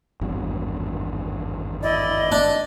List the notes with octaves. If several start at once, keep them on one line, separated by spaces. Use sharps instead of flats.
G#1 E2 G2
E4 D5 D#5
D4